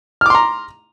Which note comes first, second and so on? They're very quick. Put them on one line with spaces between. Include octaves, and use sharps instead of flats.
F6 D6 C6 A#5